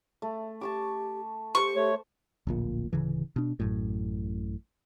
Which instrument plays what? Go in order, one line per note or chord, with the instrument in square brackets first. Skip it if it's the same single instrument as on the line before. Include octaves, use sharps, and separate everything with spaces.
[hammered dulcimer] A3
[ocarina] G4 [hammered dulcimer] A5 C#6 D6
[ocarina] G4 [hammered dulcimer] C5 C6 [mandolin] C#6
[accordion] A3 C#5
[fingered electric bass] D1 A#1 A#2
D1 C#3 E3
B2 D4
A1 F#2 A2